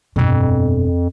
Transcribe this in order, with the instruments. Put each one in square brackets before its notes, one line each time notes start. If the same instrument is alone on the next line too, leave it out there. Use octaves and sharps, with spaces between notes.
[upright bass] G1 B2 [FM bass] F2